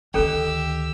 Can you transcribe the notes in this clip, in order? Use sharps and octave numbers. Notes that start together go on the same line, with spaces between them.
D2 D#3 C#4 G4 A4 G5 E6